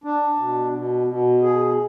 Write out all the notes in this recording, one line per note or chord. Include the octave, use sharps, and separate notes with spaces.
D4
B2
B2
B2
G#4